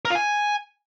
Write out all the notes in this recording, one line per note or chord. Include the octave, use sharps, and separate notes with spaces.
A#4
F4
G#5